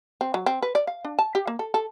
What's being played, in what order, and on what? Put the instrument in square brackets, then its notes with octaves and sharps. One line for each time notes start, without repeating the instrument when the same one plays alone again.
[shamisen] C4
F#3
C4
B4
D5
F5
D4
A5
G4
A#3
A4
A4